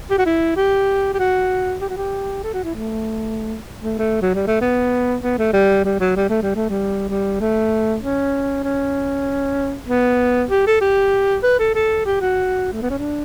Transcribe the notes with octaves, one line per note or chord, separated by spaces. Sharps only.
G4
F#4
E4
G4
G4
F#4
G4
F#4
G4
A4
F#4
E4
A3
A3
A3
F#3
G3
A3
B3
B3
A3
G3
G3
F#3
G3
A3
G3
A3
G3
G3
A3
C#4
C#4
B3
G4
A4
G4
B4
A4
A4
G4
F#4
A3
B3
C#4
D4